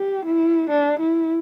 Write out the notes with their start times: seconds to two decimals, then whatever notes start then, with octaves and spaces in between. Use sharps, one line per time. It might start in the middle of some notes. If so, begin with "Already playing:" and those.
Already playing: G4
0.26 E4
0.70 D4
1.00 E4